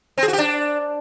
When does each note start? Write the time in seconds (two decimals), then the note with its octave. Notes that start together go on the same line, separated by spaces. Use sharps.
0.18 C4
0.23 G#4
0.28 F#4
0.33 G4
0.38 D4